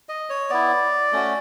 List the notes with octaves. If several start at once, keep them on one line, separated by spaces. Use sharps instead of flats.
D#5
C#5
B3 E4 D5
A3 C#4 F#4